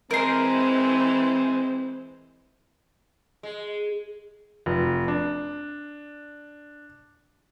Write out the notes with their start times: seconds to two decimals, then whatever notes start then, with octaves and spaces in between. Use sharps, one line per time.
0.11 E3 G#3 C4 A#4 C5 C6
3.43 G#3
4.66 F1
5.08 D4